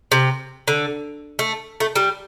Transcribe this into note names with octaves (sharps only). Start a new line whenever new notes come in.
C3
D3
A3
A3
G3